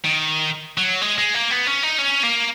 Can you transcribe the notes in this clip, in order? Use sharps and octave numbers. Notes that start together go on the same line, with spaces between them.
D#3
F#3
G#3
G#3
A#3
B3
C#4
D#4
C#4
A#3